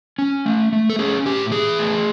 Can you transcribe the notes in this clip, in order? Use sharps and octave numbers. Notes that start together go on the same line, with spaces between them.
C#4
A3
A3
A4
C#4 G#4
A2 G4
E3 G#4
A3